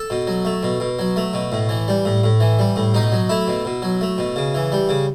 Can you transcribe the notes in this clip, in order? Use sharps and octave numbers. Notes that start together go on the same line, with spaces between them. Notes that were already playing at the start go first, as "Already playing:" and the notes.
Already playing: A4
B2
F#3
A3
B2
B2
F#3
A3
B2
A2
E3
G3
A2
A2
E3
G3
A2
B2 D#4
F#3
A3 E4
B2
B2
F#3
A3
B2
C#3
E3
G3
C#3